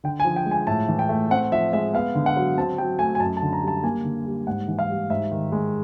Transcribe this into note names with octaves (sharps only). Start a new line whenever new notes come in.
D3 G5
G#5
F3
G5
G#3
G#5
A2 A5
E3
G5
A3
C4 F#5
F3 E5
G#3 E5
B3 F5
D3
F#5
F#3
C4 A5
F#3 G5
A3 G#5
G#5
F#2 A5
A5
D3
A#5
G3
A5
A#3 G#5
D3
G3
G#2 F#5
E3
F5
G3
G#2 E5
D#3
G#3